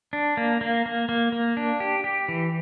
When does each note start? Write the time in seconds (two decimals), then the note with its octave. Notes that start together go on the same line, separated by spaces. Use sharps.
0.13 D4
0.37 A#3
0.61 A#3
0.86 A#3
1.09 A#3
1.32 A#3
1.57 D4
1.80 G4
2.04 G4
2.29 E3